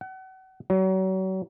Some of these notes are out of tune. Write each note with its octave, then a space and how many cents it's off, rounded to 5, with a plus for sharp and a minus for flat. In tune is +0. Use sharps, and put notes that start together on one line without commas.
F#5 +35
F#3 +35